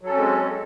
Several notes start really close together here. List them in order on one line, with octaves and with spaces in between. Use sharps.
F#3 A4 C#4 C4 G#3